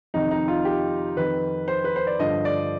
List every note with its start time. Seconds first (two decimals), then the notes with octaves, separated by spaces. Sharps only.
0.14 F2 C3 D#3 D#4
0.31 D#4
0.48 F4
0.65 G4
1.17 F2 D#3 B4
1.68 C5
1.84 B4
1.96 C5
2.07 D5
2.19 G2 D3 F3 D#5
2.45 D5